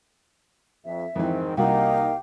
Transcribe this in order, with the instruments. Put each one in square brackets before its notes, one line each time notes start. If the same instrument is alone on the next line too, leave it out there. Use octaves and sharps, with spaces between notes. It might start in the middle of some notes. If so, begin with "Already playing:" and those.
[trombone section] F2 [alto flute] E5
[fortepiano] F2 E3 [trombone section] G#2 D#3 C4
[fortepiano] C2 F#4 [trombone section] A#3 D#4 [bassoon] G4 [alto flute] F5